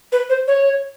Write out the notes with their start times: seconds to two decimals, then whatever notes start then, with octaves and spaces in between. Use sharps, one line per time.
0.12 B4
0.30 C5
0.48 C#5